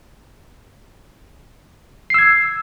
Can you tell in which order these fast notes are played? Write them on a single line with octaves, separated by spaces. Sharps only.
C7 E6 G#6